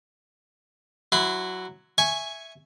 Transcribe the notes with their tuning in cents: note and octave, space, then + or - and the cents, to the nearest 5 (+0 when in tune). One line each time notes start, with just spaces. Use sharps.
F#3 +0 E4 +0 C6 -40
E5 +0 G#5 +0 C#6 +0